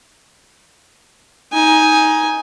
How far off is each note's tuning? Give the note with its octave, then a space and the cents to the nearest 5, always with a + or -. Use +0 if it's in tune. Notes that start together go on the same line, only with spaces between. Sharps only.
D#4 +20 G#5 +0